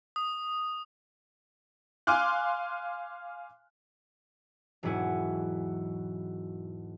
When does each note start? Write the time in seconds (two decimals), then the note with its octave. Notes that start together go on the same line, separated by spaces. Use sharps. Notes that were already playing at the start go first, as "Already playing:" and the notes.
0.16 D#6
2.07 F5 G#5 C6 D6 F6 F#6
4.83 E1 G#2 F#3 E4 F#4 G#5